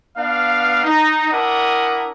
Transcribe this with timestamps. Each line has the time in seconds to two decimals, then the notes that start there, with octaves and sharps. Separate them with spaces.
0.17 B3 D4 F5
0.84 D#4
1.31 D4 E4 A#4 F#5 D#6